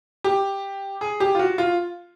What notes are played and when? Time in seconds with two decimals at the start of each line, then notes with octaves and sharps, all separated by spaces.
0.24 G4
1.01 G#4
1.20 G4
1.35 F4
1.39 F#4
1.58 F4